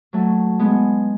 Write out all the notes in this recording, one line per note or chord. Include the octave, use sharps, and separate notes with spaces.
F#3 A3
G#3 B3